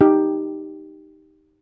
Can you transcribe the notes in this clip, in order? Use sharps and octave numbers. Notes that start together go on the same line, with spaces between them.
D#4 G4